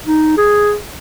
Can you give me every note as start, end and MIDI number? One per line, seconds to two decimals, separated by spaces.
0.06 0.35 63
0.37 0.75 68